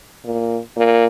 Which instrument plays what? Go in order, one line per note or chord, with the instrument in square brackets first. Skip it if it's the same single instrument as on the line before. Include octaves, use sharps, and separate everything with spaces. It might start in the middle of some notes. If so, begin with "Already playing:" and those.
[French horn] A#2
A#2